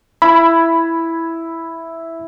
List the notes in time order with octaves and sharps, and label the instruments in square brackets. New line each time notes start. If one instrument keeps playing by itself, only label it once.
[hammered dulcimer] E4 [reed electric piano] B5